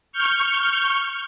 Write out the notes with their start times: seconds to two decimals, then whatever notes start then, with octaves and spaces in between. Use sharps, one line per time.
0.12 C#6 F6 G6